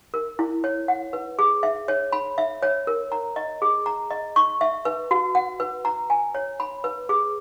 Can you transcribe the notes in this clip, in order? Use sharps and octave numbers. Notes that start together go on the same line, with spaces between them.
A#4
E4
C#5
F#5
B4
G#4
E5
C#5
B5
E5
C#5
A#4
A#5
D#5
G#4
A#5
D#5
C#6
E5
B4
F#4
F#5
B4
A#5
G#5
C#5
B5
B4
G#4